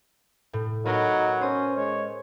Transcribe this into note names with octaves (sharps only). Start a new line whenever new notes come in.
A2
F#3 B3 D#4 A#4 D#5
C#4 C5 D#6
G#3 C#5